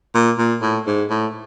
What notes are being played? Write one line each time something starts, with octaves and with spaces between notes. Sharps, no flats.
A#2
A#2
A2
G#2
A2